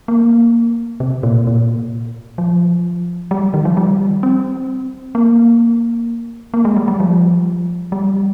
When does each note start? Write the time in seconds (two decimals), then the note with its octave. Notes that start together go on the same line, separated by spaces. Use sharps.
0.08 A#3
1.00 C3
1.23 A#2
1.47 A#2
2.38 F3
3.31 G3
3.54 D#3
3.65 F3
3.77 G3
4.23 C4
5.15 A#3
6.54 A#3
6.65 G#3
6.76 G3
6.88 G3
7.00 F3
7.92 G3